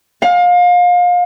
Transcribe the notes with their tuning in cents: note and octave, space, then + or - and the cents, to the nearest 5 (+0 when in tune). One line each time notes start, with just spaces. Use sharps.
F5 +30